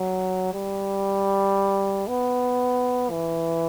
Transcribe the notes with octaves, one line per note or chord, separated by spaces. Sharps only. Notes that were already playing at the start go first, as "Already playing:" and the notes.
Already playing: F#3
G3
B3
E3